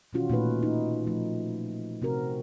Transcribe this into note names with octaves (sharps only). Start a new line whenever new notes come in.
B2 D#3 E3 C#4 F4 F#4
A#2 A3 D#4 B4
D#4
F3 A3
C3 C4 F#4 A#4